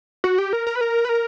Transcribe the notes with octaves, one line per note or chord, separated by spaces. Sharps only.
F#4
G4
A#4
A#4
B4
A#4
B4
A#4